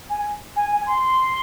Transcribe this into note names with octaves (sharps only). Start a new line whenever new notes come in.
G#5
G#5
G#5
C6